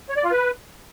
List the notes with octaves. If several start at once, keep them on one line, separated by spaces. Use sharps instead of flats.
C#5
D5
F4
B4